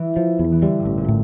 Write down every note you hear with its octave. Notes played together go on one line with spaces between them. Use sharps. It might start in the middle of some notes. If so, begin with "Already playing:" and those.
Already playing: E3
F3
E2
E3
D3 G3
G2
A1
A#2
A2